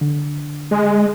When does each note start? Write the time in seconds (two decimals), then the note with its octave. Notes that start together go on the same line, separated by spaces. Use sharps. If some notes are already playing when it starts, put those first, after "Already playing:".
0.01 D3
0.71 G#3